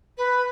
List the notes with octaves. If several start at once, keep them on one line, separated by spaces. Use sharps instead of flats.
B4